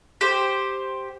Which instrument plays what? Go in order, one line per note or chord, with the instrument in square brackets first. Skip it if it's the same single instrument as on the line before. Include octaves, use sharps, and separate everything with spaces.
[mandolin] G4 C5